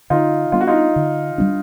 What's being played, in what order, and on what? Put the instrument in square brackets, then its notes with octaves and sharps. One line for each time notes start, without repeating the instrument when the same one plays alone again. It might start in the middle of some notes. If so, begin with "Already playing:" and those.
[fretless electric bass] D3 [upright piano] D#4 F4
[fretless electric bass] G3 B3 D4 [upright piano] F4
[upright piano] F#4
D#4 F4
[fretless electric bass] D3
G3 B3 D4